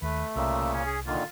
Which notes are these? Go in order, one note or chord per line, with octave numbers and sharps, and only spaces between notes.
D#2 A3 B4
C2 A#2 C#3 A#3 E5
C#4
G#4
A#2 D3 D#3 A#3 F4